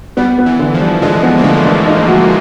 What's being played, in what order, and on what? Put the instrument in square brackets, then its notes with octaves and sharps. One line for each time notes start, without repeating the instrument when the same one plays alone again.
[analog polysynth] G3 [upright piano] B3
[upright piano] B3
[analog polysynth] E3
[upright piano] D3
[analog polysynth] F3
[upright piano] G3
[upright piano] D3 [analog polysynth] G#3
[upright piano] B3
[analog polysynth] A#3
[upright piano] D3 [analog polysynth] A3
[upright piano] D3
D#4
F#4